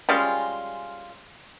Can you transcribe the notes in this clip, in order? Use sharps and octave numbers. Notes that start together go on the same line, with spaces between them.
G3 G#3 C#4 F4